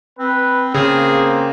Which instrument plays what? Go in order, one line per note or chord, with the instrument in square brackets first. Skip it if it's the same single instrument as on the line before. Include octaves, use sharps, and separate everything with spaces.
[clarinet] C4 [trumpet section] B4
[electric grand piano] C#3 [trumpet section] A#3 C4 [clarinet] G#4